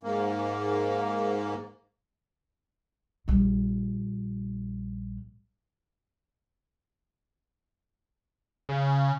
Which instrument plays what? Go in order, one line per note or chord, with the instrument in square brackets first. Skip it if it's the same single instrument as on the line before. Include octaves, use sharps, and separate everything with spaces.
[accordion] G#2 A#3
[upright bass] A#1 G3
[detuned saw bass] C#3